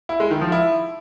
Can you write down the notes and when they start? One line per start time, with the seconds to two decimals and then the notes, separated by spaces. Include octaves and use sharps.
0.09 E4
0.20 G#3
0.31 D#3
0.41 F3
0.52 E4